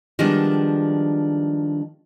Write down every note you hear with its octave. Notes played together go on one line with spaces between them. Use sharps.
D#3 F3 G3 G#3 B3 D4